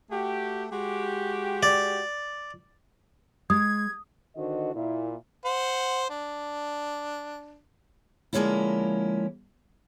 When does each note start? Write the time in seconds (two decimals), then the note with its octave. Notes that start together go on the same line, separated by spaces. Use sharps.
0.11 A3 F#4 G4
0.72 G#3 F#4 G4
1.63 D5
3.50 G#3 D#6 G#6
4.36 D3 D#3 F#4 C5 D#5
4.74 A#2 E4
5.45 C5 F#5
6.10 D4
8.33 D3 F3 G#3 A#3 C#4 E4